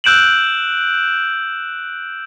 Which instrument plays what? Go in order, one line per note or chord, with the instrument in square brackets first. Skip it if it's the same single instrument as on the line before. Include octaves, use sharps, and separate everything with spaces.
[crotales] E6 F#6 G6 D7 E7 F#7